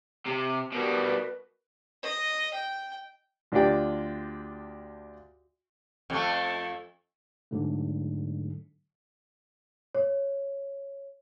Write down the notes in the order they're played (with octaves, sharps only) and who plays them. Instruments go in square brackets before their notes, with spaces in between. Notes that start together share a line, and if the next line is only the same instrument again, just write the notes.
[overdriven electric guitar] C3
[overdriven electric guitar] B2 G3 [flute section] F#4 A#4 B4
[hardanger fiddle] D#5
G5
[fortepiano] D2 D4 F4 G4 D5 G5
[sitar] F2 A3
[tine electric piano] G#2 D3 F#3 A3
[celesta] C#5